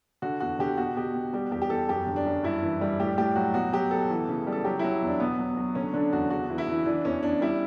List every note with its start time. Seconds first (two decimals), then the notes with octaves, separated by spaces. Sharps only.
0.22 D3 F#4
0.40 E2 F#4
0.59 D3 G4
0.77 B2 F#4
0.96 B2 G4
1.14 B2
1.33 G3 G4
1.51 E2 G4
1.62 G4
1.69 E2 A4
1.89 F#2 G4
2.07 D3
2.16 D4
2.26 F#2
2.44 G2 E4
2.62 E3
2.81 G3
3.00 A2 G4
3.17 A2 G4
3.35 F#3 F#4
3.54 B2 F#4
3.73 F#3 G4
3.91 B2 A4
4.10 E3
4.29 C#3
4.47 G3
4.52 A4
4.65 F#3 G4
4.79 E4
4.84 F#3
5.02 E2
5.07 D4
5.20 B2 B3
5.39 F#3
5.57 F#3
5.75 D3 C#4
5.94 D3 D4
6.13 E2 F#4
6.30 C#3 F#4
6.50 E3
6.58 E4
6.68 E3
6.86 E3 D4
7.05 E2 C#4
7.23 E2 D4
7.41 G3 E4